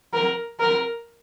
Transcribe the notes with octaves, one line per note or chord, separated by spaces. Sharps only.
A#4
A#4